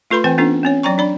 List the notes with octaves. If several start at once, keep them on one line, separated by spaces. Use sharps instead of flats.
A3 F4 A4 B4 B5 C6
E3 C4 B4 G5 G#5
B3 C#4 D4 F4 A4
C4 C#4 C#5
F#3 D5 G5 A#5 C#6
D4 D5 B5